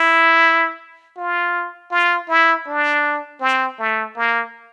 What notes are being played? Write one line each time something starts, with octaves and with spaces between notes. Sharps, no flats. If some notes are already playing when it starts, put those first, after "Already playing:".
Already playing: E4
F4
F4
E4
D4
C4
A3
A#3